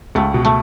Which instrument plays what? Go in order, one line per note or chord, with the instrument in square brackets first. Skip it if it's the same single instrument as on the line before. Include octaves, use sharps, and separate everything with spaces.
[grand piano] C#2 [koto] A3
[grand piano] B2
[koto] A3